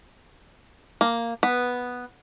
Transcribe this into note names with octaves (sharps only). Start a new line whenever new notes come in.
A#3
B3